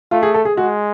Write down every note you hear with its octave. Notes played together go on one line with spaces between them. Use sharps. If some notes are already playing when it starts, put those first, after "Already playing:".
A3 F4
G#4
A4
G#4
G#3 F#4